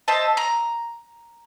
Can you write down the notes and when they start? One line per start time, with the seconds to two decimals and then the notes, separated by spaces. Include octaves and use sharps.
0.08 C5 D#5 E5 A5
0.37 A#5